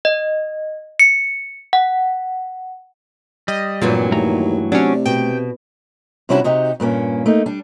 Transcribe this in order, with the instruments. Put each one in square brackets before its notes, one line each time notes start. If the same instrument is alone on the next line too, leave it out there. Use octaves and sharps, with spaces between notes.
[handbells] D#5
C#7
F#5
[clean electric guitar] G3 [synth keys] D#5
[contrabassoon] F1 [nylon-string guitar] G2 E3 F#3 [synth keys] A#2
[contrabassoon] D#2 [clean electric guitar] A3 A#5
[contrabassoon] C3 [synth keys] F#3 C#4 [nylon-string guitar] D4
[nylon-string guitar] B2 [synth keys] G5
[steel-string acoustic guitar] C3 G3 C#4 D4 E4 F#4
C3 D#4 F#4 G4
G2 A#2 A#3 C#4
A3 A#3 D#4
G3 D4